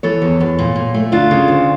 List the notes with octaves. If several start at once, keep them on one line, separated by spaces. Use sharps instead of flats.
E3 A4 C#5
E2
E2
A#2
A#2
A3
D2 D4 F4
C#3
D2